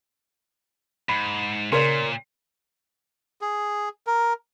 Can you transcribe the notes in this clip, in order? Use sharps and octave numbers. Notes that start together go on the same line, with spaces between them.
G#2 B5
A#2 C#3 A#4 C#5 D5 C6
G#4
A#4